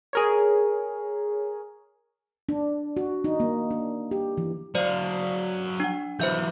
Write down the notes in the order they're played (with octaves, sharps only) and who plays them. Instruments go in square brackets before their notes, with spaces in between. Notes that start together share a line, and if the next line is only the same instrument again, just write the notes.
[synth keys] G#4 A#4 C#5
[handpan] D4
F#4
D#4
A#3
D4
G4
E3
[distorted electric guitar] F#3 F5 [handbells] C5 D5
[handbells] D4 F#5
[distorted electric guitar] E3 F#3 [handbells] C5 E5 G6